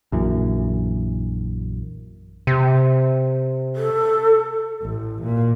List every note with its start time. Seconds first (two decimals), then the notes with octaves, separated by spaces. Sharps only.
0.12 A#1 F#2 E3
2.47 C3
3.76 A4
4.82 A1
5.23 A#2